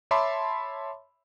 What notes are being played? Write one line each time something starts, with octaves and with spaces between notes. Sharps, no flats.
C#5 E5 A5 B5 C6 D6